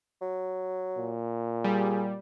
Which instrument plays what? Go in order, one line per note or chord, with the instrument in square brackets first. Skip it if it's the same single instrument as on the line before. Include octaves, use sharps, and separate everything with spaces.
[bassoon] F#3
[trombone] A#2
[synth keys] G3 [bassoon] G#4